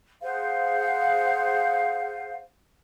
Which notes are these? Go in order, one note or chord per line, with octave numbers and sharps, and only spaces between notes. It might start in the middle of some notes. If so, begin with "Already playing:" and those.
G#4 C5 F5 F#5